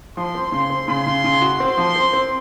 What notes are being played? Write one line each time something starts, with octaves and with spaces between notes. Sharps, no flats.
F3 C6
C4
C#3 C6
C4
C#3 C6
C#3
C#3
F#4
C4 C6
F3
C4
C4